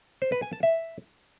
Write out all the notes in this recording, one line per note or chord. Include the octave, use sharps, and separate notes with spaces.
C5
B4
G#5
A5
E5